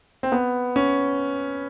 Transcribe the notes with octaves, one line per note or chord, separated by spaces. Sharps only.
C4
B3
C#4